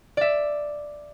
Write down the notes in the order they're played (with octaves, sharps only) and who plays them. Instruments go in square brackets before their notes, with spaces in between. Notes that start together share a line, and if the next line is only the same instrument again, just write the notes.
[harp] D5 E5